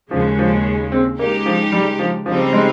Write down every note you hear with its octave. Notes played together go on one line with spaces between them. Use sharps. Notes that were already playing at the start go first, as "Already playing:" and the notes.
D#2 C#3 F3 G#3
F3
C4
C#2 C#3 G#3 A#3 D#4 G4
F3
G3
F3
C#2 C#3 F3 G3 C4 D#4
G#3